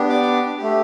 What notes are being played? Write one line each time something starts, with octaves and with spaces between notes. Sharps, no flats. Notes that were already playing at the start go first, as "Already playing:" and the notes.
Already playing: B3 D4 G4
D5 D6
A3 G4